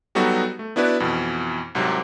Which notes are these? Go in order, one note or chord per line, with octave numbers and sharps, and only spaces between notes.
F#3 G3 B3 D#4 F#4 A4
A3
B3 D4 E4 F#4 B4 D5
F2 B2 E3
C2 G#2 C3 F#3